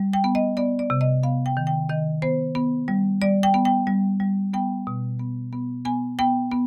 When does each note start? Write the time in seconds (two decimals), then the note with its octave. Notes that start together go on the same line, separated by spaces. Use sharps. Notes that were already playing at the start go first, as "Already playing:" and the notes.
Already playing: G3
0.13 G5
0.24 B3
0.35 D#5
0.57 B3 D5
0.79 D5
0.90 C3
1.01 D#5
1.23 B3 F5
1.46 G5
1.57 D#3
1.67 G5
1.89 D#3 D#5
2.22 B3 C5
2.55 B3
2.88 G3
3.21 G3 D5
3.43 G5
3.54 B3
3.65 G5
3.87 G3
4.20 G3
4.53 B3 G5
4.87 B2
5.19 B3
5.53 B3
5.85 B3 G#5
6.19 B3 G5
6.51 B3